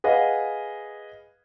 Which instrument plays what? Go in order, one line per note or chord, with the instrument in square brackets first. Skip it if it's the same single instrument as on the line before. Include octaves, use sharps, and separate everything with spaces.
[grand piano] G#4 B4 D#5 F5 F#5